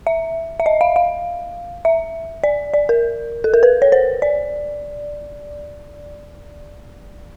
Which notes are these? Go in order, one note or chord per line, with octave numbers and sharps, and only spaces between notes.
E5
E5
D#5
F5
F5
E5
D5
D5
A#4
A4
A#4
B4
C#5
C5
D5